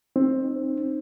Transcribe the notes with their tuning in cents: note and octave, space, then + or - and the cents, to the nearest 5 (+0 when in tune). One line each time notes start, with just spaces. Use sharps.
C4 +15 D#4 -25